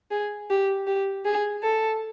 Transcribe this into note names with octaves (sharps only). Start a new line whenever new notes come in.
G#4
G4
G4
G#4
A4